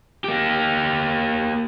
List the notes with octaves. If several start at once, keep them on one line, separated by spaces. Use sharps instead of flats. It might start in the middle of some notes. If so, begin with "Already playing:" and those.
A#3 G4